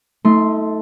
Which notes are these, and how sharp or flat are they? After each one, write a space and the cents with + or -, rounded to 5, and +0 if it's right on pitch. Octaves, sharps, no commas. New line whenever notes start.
A3 +0 D#4 +40 C6 +0